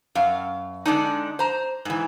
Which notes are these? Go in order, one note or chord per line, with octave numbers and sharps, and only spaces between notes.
F#2 F5
D3 G#3 D4 D#4
C5 A#5
G#2 E3